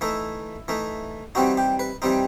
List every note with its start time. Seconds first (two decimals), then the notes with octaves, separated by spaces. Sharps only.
0.01 E3 A3 D#4 E4
0.68 E3 A3 D#4
1.35 E3 G3 C4 D#4 F#4
1.57 G4
1.79 B4
2.02 E3 G3 C4 D#4